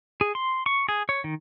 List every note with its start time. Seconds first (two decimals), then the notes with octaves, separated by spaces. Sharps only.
0.21 G#4
0.35 C6
0.66 C#6
0.89 G#4
1.09 C#5
1.24 D#3